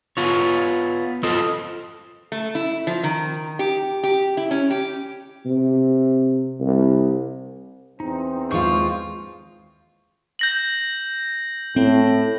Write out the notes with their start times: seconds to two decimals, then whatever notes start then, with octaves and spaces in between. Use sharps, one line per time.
0.17 B3 F4 C#5
1.23 F4 A4 C5 D#5
2.32 A3
2.55 E4
2.87 F3
3.03 D#3
3.59 G4
4.03 G4
4.37 E4
4.51 C#4
4.70 G4
5.46 C3
6.60 C2
8.00 E2 C4 D#4
8.51 D#2 G#3 F4 C5 F5 C#6
10.39 G6 A#6 F#7
11.76 A2 C4